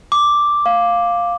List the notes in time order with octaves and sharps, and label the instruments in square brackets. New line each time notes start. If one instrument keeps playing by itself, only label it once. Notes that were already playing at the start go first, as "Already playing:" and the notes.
[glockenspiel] D6
[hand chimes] F5